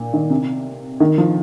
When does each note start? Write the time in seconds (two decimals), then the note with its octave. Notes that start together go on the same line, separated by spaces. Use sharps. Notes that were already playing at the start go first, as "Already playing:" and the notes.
Already playing: A#2
0.13 D#3
0.30 C3
1.00 D#3
1.18 F3